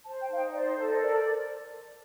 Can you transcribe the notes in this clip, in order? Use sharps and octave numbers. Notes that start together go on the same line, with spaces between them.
C5 A5
G5
D#4 F5
G5
C5 D5
A4
D#5
A#4 D5